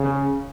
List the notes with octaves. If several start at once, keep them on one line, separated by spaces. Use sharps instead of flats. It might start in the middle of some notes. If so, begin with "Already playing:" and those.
Already playing: C#3